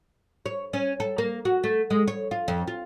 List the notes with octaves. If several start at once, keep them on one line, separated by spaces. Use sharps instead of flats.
C#5
C#4
A4
A#3
F#4
A3
G#3
C#5
F4
F2
F4